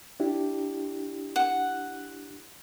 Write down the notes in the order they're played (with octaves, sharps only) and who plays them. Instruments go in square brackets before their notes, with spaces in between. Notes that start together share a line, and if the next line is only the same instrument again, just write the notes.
[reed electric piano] D4 E4 G4
[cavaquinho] F#5